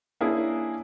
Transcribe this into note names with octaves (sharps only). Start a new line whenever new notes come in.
A#3 C#4 D4 E4 G#4 A#4